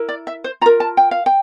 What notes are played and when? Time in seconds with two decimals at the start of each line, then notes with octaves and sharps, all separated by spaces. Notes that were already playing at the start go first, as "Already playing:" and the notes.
Already playing: E4 A#4
0.09 D5
0.27 E5
0.44 C5
0.61 F4 A#5
0.66 A#4
0.80 A5
0.97 G5
1.11 F5
1.26 G5